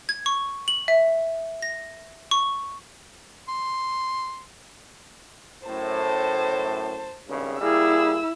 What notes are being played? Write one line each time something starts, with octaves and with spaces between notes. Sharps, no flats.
G#6
C#6
F#7
E5
A#6
C#6
C6
F#2 A2 C5 A5
G#1 G2 C#3
G3 A#3 E4 G#4 E6